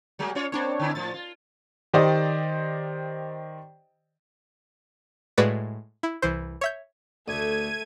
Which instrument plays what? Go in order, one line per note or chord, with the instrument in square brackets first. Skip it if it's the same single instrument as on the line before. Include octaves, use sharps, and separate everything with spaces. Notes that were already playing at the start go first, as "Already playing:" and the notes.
[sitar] F#3 G3 A#3
C#4 F4 C#5
[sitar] A#3 [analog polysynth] C4 D4 C#5
[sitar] D3 D#4 E4
[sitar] A2 F3 [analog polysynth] A6
[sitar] F4
[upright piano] D#3 G4 C5 D5 D#5
[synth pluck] A2 G#3 F#4 B4 D5
E4
C2 E3 C5
C#5 E5 G6
[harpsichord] D2 [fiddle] A3 [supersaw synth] G#6 D#7